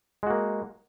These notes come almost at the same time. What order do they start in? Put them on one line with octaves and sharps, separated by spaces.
G#3 F#4 A#3